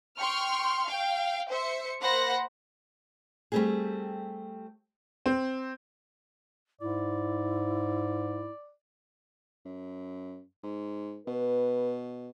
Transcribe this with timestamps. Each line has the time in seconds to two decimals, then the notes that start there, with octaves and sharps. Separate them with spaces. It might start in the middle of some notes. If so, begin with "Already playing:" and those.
0.17 G5 C6 C#6 F6
0.87 F5 G5
1.50 C5 E5 C#7
2.01 A#3 C5 F#5 B5 A#6
3.52 G3 A3 B3 C4 G4 G#4
5.26 C4
6.81 G#2 E4 D5
9.65 F#2
10.64 G#2
11.27 B2 B4